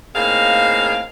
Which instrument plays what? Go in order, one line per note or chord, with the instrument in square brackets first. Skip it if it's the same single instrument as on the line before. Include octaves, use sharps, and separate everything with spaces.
[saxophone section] A2 A#3 C4 D#4 G#4 F5